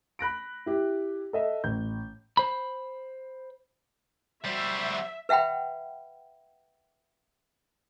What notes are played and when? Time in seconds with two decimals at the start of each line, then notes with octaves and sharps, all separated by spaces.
0.19 B5 F#6 A#6 D7
0.66 E4 G4
1.33 A4 D#5 E5
1.64 A1 G6
2.37 C5 B5
4.45 G3 F#4 C5 E5
5.29 B4 E5 F#5 G5 B5